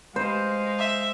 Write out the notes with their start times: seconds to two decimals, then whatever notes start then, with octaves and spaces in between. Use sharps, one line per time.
0.16 G#3 C5 F5
0.79 E5